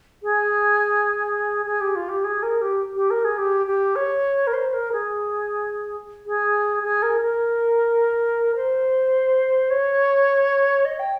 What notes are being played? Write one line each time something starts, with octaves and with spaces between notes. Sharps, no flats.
G#4
G#4
G4
F4
G4
G#4
A#4
G4
G4
A#4
G#4
G4
G4
C#5
A#4
C5
A#4
G#4
G#4
G#4
A#4
A#4
C5
C#5
D#5
G5